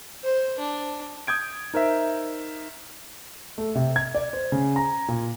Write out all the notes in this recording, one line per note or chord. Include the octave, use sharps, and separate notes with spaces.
C5
D4
D#6 G6 G#6 D7
D#4 A#4 C5 E5
A3
C3
G#6
D5
C5
C#3
A#5
A#2